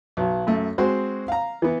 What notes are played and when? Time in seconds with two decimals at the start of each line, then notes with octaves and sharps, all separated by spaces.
0.17 B1 F#3
0.47 F#2 A3
0.78 G#3 C4 F#4 C5
1.28 F5 A#5
1.62 E3 B3